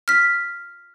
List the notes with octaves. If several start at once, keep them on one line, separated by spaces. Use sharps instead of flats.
F6 B6